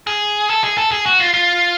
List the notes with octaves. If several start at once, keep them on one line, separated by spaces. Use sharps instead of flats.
G#4
A4
G#4
A4
G#4
F#4
F4
F4